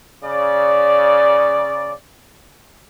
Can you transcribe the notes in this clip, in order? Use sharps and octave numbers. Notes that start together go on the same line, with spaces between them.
C#3 D5